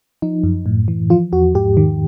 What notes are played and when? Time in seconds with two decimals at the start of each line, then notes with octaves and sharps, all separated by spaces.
0.22 F3 D#4
0.44 F#2
0.66 A2
0.88 E3
1.10 F3 F4
1.33 E2 F#4
1.55 G#2 G4
1.77 D#3